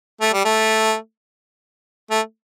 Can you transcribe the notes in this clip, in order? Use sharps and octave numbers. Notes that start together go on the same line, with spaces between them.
A3
G3
A3
A3